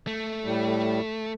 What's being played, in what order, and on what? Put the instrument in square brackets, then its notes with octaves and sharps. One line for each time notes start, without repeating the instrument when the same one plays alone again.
[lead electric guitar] A3
[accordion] A2 G3